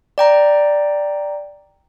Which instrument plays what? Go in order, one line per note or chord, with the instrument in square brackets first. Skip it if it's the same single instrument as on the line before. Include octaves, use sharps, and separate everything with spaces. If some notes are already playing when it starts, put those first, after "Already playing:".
[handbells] D5 G5 A#5